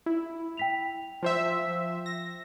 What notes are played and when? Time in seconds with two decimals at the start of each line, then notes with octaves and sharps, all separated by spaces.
0.06 E4
0.57 G5 B6 F7
1.23 F3 C5 E5
2.06 A#6